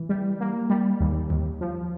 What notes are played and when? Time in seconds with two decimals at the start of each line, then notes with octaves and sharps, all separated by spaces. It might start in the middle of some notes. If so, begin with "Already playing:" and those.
Already playing: E3
0.09 G3
0.40 A#3
0.70 G3
1.00 D#2
1.30 D#2
1.61 F3